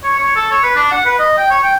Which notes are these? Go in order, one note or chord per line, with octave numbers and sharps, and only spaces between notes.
C#5
C#5
A4
C#5
B4
D4
F#5
B4
D#5
G5
C#5
G5